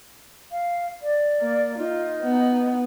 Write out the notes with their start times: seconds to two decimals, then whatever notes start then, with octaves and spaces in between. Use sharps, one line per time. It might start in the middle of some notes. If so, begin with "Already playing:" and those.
0.52 F5
1.02 D5
1.41 A#3
1.78 D#4 F4
2.23 B3